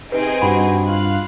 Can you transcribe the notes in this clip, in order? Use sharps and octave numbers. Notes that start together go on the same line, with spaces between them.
C3 C4 D#4 G#4 B4
G2 F#4 B5
F4 F5 F#6